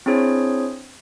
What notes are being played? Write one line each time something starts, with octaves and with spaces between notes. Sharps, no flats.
C4 D4 E4 G#4 C5 C#5